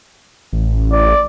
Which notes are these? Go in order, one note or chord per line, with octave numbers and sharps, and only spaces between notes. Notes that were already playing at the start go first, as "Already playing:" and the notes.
A1
D5